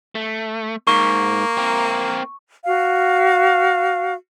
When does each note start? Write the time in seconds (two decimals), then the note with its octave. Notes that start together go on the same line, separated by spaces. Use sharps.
0.15 A3
0.87 G#2 A#3 C#6
1.58 C4 A#4
2.64 F#4 F5